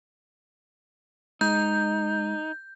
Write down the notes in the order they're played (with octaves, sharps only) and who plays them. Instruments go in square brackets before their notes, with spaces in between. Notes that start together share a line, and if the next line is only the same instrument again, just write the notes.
[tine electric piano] G#3 [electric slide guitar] D#4 [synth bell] G6